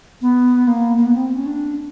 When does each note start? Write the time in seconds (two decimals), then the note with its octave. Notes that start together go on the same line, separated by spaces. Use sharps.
0.21 B3
0.67 A#3
0.97 A#3
1.06 B3
1.15 C4
1.36 C#4
1.46 D4